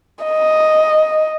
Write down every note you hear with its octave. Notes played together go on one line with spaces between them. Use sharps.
D#5